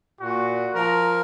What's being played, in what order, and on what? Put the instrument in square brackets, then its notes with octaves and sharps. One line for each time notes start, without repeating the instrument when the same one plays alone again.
[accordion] A#2 [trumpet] F#4
[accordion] F3 A#4 [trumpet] A#5